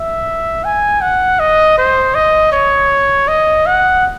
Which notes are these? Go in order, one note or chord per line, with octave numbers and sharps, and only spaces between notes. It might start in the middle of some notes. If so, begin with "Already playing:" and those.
Already playing: E5
G#5
F#5
D#5
C5
D#5
C#5
D#5
F#5